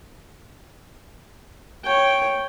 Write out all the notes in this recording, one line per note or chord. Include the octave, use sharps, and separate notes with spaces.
C#5 G5